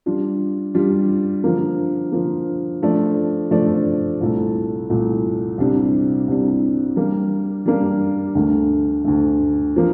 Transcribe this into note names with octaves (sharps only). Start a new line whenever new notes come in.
G3 D4 F4
G3 D4 F4
D3 F3 A#3
D3 F3 A#3
F3 A3 D4 A4 D5
F3 A3 D4 A4 D5
C2 A#2 A3
C2 A#2 A3
C2 C3 G3 D4
C2 C3 G3 D4
G3 A#3 D4 G4
G3 A#3 D4 G4
D2 D3 A3
D2 D3 A3
F3 A#3